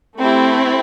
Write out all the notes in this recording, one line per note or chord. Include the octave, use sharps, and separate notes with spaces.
A3 C4 E4 G4